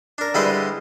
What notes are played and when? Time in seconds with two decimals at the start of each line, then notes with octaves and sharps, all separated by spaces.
0.18 D4 A#4
0.34 D3 G3 G#3 E4 B4 C5